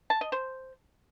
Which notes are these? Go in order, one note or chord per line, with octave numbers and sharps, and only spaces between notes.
A5
D#5
C5